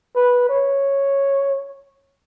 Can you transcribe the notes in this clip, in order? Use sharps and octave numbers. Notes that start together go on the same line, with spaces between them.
B4
C#5